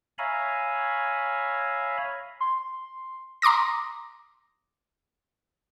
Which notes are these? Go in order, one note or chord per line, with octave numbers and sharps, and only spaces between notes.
C#5 E5 F5 G#5 A#5 B5
C6
A#5 C6 D6 D#6 A#6